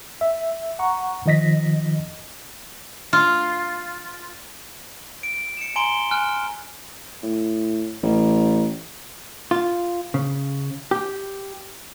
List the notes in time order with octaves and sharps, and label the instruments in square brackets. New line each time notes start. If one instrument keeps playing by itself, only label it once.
[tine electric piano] E5
F#5 A#5 C#6
D#3 F3 D#5 A#6 B6
[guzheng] F4
[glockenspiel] D7
C#7 E7
G#5 A#5 C6 D7 G7
G#5 F6 F#6
[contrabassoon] A2
A1
[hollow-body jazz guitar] F4
C#3
G4